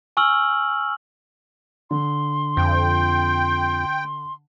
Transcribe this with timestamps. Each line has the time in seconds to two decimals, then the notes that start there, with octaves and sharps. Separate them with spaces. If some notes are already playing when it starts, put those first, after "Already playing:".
0.17 G#5 C#6 E6 F6 F#7
1.91 D3 C6
2.57 F2 G5